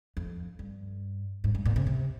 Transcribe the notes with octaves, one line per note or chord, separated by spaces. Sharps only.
F2
G2
G#2
G2
A#2
C3
C3